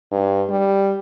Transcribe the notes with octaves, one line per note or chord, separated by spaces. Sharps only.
G2
G3